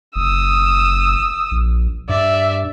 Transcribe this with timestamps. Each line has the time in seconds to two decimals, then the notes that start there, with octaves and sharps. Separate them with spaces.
0.16 F#1 D#6 E6
1.51 A#1
2.09 G2 D5 E5